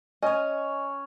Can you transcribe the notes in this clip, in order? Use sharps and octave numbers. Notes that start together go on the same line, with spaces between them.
C#4 C#5 D#5 G#5